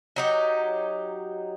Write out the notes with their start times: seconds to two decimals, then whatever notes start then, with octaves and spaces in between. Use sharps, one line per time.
0.16 F#3 D#4 G4